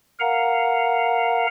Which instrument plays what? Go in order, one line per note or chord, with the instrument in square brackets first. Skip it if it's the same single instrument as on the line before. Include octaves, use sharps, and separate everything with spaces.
[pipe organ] A#4 F5 F#5 A#5